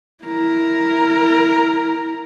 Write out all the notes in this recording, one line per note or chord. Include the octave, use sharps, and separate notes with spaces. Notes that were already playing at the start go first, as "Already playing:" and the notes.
E4 A#4